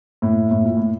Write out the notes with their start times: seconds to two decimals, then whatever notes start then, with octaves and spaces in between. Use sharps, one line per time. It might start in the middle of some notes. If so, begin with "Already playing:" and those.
0.22 A2
0.51 A2
0.65 A#2
0.77 A2